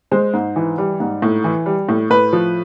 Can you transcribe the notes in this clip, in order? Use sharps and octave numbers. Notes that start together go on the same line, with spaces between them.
G#3 C5
G#2
E3
G3
G#2
A2
E3
G3
A2
A2 B4
F3